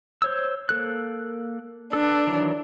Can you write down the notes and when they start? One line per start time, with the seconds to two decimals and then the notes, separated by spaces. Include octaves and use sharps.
0.22 C5 C#5 E6
0.69 A#3 A4 F#6
1.93 D4 A4 B4
2.27 D#3 E3 F#3